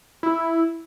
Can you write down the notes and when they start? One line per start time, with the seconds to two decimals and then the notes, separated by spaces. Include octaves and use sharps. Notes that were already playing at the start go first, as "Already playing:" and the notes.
0.23 E4